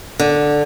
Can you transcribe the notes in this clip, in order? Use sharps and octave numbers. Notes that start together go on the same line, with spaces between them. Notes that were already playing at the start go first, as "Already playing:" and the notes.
D3